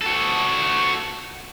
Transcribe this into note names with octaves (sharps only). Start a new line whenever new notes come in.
F#4 A4